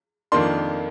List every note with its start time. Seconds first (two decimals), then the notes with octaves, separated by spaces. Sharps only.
0.32 F2 D#3 A#3 D4 C6